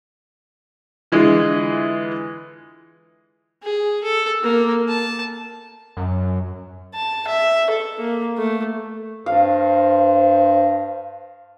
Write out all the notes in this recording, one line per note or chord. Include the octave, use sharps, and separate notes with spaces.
D3 E3 G#3 F4 G#4
G#4
A4
A#3
A5
F#2
A5
E5
A4
A#3
A3
G2 C5 F5